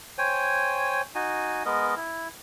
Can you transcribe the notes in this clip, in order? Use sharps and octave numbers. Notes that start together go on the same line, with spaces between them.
C5 C#5 G5 G#5
D#4 F#4 G#5
G#3 B3 A#4 D#5
E4